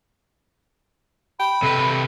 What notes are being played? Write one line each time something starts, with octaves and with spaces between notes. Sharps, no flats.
G5 B5
C3 A4 B4